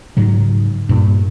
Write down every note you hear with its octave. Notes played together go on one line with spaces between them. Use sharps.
G#2 C#3 F#3
G2 A#2